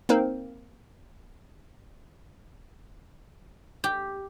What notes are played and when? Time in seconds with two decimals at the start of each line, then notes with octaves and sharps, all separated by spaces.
0.09 A#3 C4 D#4 A#4 C5
3.84 G4